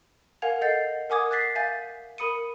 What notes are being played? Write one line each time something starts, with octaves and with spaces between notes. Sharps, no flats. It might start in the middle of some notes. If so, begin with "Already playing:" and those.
A#4 F5 F#5 G#5 G#6 F7
A4 D#5 F#5 G6 A6 C7
A#4 F#5 G#5 D6 D#6 G#6
F#6 G#6 A6 B6 C7
E5 F5 G#5 G6 A6 B6
A#4 B5 D#6 C#7 D#7